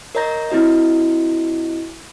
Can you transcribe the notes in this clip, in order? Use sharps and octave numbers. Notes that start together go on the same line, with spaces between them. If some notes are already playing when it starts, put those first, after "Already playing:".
A#4 C#5 D#5 A#5 G6 A#6
C4 E4 F#4 D#5